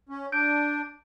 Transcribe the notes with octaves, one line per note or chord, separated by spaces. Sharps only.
C#4
D4 G6 D7